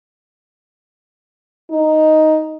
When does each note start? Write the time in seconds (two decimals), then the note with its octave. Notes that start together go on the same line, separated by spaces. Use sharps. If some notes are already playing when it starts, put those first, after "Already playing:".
1.71 D#4